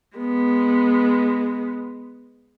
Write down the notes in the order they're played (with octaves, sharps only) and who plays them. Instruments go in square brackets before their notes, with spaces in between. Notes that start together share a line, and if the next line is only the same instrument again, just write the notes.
[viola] G#3 B3